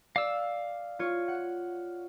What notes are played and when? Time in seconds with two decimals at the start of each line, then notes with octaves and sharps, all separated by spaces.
0.16 D5 F5 E6 E7
0.99 F4 C#5
1.28 F#5